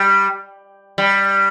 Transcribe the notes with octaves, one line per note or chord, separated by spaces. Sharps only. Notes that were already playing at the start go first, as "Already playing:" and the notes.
Already playing: G3
G3